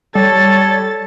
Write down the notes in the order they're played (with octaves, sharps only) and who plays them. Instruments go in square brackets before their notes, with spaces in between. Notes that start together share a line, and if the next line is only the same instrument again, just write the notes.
[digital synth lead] G3 [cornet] A4 [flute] C#5 [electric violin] A6